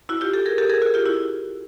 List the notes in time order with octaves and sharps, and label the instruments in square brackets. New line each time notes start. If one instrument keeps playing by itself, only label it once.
[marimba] E4 F#4
F4 G4
G4 A4
G#4 A#4
G4 A4
G#4 A#4
F#4 G#4
F4 G4
E4 F#4